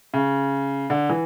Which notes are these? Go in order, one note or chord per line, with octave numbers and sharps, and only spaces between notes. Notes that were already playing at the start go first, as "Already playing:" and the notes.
C#3
D3
E3